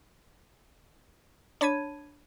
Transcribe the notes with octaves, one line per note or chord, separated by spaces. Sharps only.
D4 C#5 A5 B5 G#6 D#7